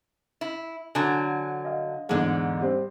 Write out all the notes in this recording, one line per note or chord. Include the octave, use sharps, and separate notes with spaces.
E4
D3 F#3 G#5
D#5 F5
E2 G#2 D3 G#3
G3 C4